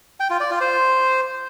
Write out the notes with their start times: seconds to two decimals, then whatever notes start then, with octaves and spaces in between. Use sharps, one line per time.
0.20 G5
0.30 F4
0.40 D5
0.51 F4
0.61 C5